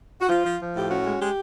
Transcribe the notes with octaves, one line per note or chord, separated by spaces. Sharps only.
F#4
F3 F4
F3
F3
A2 G4
C#4 F#4
G#3
G#3 G4